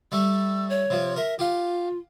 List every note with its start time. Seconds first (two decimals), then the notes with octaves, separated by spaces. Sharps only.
0.12 G3 A3 E6
0.70 C#5
0.90 C3 F3
1.16 A#4 E5
1.39 F4 G4 F5